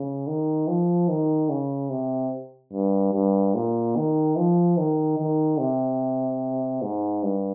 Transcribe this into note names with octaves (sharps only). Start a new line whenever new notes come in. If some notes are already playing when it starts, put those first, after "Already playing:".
Already playing: C#3
D#3
F3
D#3
C#3
C3
G2
G2
A#2
D#3
F3
D#3
D#3
C3
G#2
G2